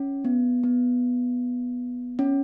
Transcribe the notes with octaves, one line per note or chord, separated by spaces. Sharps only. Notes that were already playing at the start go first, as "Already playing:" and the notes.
Already playing: C#4
B3
B3
C#4